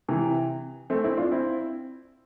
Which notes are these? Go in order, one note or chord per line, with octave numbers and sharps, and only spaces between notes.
C3 E3
A3 C4
C4 E4
D4 F4
C4 E4